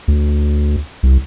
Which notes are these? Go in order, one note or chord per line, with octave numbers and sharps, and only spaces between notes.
D2
C2